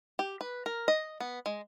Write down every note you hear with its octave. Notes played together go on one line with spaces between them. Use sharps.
G4
B4
A#4
D#5
B3
G#3